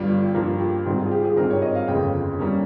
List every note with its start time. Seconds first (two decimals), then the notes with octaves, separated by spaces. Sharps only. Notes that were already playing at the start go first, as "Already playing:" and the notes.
Already playing: G1 G2 G3 F4
0.25 G4
0.35 G2 F3 A#3 F4
0.60 G4
0.86 G#1 G#2 G3 C4 D#4 G4
0.99 F4
1.06 G#4
1.11 G4
1.24 G#4
1.37 G#1 G2 G3 C4 D#4 A#4
1.50 C#5
1.62 D#5
1.75 F5
1.88 G1 F2 C#3 G#3 G5
2.39 G3 A#3 C#4